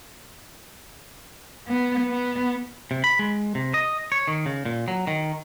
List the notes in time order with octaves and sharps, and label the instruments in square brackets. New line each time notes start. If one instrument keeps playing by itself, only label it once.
[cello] B3
B3
[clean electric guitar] C3
B5
G#3
C3
D#5
C#5
D#3
C#3
A#2
F#3
D#3